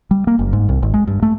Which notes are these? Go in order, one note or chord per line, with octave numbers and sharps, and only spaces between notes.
G3
A#3
F#1
G#2
C2
G#1
G#3
G2
A3